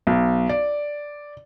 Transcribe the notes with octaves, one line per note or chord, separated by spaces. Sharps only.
B1
D5